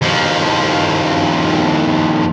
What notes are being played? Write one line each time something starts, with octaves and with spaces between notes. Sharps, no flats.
D#2 F3